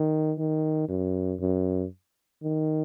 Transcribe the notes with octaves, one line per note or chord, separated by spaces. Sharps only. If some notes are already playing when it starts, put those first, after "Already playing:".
Already playing: D#3
D#3
F#2
F#2
D#3